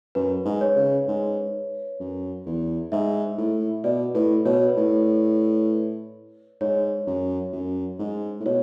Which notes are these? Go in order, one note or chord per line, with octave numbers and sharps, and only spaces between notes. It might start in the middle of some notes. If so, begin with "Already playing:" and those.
F#2 B4
G#2
C#5
C#3
G#2
F#2
E2
G#2 E5
A2
B2 D5
A2 B4
B2 C#5
B4
B4
A2
G#2 C#5
F#2
F#2
G#2
A2
B2 C#5